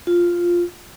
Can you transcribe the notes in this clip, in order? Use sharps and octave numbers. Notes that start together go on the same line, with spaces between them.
F4